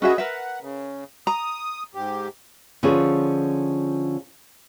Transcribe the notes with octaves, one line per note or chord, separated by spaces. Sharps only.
C#4 F#4 G#4 B4 D#5 E5
A#4 B4 E5 F#5
C#3
A#5 D#6
G#2 G4
D3 F3 C#4 F4 G#4 B4